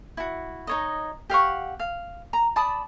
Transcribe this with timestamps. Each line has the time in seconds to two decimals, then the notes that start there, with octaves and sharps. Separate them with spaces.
0.17 E4 F#4
0.67 D#4 C#5 D#5
1.30 G4 F5 F#5 C#6
1.79 F5
2.33 A#5
2.56 D5 A5 B5 D#6